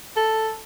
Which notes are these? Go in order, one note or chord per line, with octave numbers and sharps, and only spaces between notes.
A4